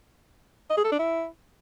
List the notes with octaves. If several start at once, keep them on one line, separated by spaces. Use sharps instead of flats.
D#5
G#4
A4
D4
E4